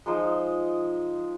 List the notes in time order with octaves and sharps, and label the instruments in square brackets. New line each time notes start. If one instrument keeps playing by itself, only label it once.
[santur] F3 G#3 D#4